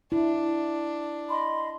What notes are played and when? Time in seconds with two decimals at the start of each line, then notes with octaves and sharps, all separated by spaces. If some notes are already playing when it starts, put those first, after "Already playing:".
0.12 D4 E4
1.30 D#5 B5 C6